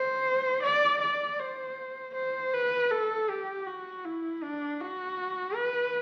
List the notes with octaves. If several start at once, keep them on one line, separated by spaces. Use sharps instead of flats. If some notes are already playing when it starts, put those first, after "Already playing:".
Already playing: C5
D5
D5
C5
C5
B4
A4
G4
F#4
E4
D4
F#4
B4